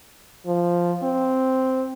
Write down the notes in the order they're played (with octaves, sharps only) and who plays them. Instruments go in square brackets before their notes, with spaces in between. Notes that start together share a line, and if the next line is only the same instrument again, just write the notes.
[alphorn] F3
C4